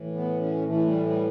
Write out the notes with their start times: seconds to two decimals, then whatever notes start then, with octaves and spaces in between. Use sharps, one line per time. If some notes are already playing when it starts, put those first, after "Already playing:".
Already playing: A2 E3
0.14 B3
0.40 C#4
0.66 A2 E3 A3
0.86 G3
1.05 G3